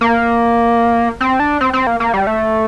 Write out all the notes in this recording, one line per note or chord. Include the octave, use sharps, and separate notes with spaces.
A#3
C4
D4
C4
C4
A#3
A#3
G3
A3